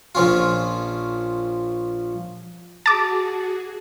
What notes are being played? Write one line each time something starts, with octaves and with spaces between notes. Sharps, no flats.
A#1 F3 C#4 F4
F#4 G#4 A5 D6